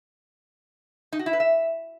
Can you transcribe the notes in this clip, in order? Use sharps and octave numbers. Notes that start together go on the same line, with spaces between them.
D#4
F#4
E4
B4
E5